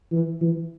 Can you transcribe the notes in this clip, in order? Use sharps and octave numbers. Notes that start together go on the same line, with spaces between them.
E3
E3